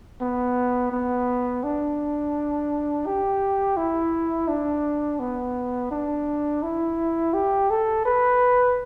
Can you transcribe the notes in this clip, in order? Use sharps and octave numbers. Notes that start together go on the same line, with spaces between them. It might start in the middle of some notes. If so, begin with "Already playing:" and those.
B3
B3
D4
G4
E4
D4
B3
D4
E4
G4
A4
B4